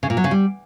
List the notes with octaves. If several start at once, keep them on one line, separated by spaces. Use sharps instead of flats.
C#3
A#2
F#3
C#3
G3